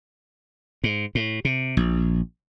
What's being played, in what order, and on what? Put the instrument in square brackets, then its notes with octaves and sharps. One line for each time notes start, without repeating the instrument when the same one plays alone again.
[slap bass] G#2
A2
C3
A#1